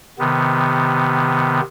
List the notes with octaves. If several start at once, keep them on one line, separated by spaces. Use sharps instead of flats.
C3 D#3 B3